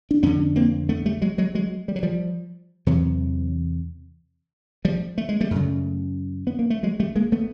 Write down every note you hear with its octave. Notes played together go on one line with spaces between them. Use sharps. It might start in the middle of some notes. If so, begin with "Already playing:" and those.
D4
F2 D3 B3 C#4
A#3 C4
A3 B3
G3 A3
F#3 G#3
F#3 G#3
F#3 G#3
G3
F#3
F3 G3
E2 C3 E3 F#3
F3 G3
A3
G#3
G3 A3
F#2 C#3
B3
A#3
A3
F#3 G#3
G3 A3
G#3 A#3
A3 B3